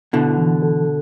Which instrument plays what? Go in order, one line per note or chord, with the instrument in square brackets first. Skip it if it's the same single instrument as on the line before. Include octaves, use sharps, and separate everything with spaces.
[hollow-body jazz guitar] B2 D3 [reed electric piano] E4
[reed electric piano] E3
A4